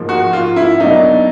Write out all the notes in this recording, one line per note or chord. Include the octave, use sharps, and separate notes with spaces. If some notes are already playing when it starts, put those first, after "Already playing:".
Already playing: G#2 F3 A#3
F#4
F4
E4
B2 F#3 A#3 D4 D#4